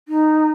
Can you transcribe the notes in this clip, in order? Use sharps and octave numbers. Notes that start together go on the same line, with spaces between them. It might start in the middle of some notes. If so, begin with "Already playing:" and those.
D#4